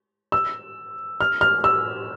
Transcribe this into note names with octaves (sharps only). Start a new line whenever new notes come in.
E6
F6
F6
E6